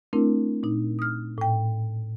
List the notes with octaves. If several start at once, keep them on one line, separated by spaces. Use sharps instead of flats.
A3 C4 D4 E4 A#4
A#2 D#4
D#6 F6
A2 G5